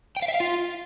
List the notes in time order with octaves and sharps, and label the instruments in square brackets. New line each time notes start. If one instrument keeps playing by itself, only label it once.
[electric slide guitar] G5
F5
E5
F5
F4